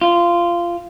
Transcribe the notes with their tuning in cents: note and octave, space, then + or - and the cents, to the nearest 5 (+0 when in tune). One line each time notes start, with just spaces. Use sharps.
F4 -15